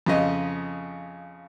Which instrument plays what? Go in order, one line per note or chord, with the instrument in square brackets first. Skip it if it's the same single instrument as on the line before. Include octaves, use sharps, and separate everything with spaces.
[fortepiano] F2 C#3 D#5